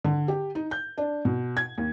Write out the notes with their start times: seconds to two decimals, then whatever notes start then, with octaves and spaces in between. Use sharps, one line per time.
0.04 D3
0.28 G4
0.55 D#4
0.71 G6
0.98 D4
1.25 B2
1.57 G#6
1.78 D#2